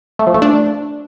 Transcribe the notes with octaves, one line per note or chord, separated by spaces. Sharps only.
A3
F3
A3
D4